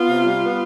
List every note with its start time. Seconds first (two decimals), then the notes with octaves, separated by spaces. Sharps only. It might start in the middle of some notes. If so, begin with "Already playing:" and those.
Already playing: B3 F4
0.10 C3
0.26 G3
0.42 B3